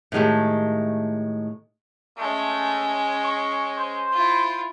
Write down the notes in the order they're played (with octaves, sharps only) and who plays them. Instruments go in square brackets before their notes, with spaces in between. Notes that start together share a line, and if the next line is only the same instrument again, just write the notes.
[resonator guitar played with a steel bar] A2 D#3 G#3 A3 G4
[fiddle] G#3 C#4 [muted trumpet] A3
[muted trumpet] C#6
C5
[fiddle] E4 F4